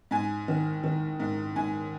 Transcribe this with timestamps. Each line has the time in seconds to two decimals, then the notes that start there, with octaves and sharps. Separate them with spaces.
0.11 G#2 G#5
0.48 D#3
0.84 D#3
1.20 G#2
1.56 G#2 G#5